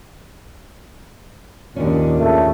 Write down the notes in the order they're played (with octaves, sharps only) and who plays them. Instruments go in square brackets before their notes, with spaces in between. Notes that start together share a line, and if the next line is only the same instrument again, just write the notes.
[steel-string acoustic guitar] D#2 C#4 [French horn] A#2 [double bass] D#3 D4
[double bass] C#3 [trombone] A3